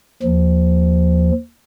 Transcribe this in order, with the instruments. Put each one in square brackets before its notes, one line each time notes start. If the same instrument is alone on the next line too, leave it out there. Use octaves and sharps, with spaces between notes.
[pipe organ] D#2 F3